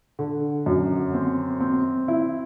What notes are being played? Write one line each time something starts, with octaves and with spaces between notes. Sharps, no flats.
D3
F#2
C4
C4
E4